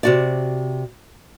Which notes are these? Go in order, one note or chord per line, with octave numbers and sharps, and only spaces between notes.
C3 F#4 D5